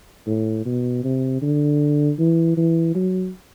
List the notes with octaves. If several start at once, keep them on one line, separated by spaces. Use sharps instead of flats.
A2
B2
C3
D3
E3
E3
F#3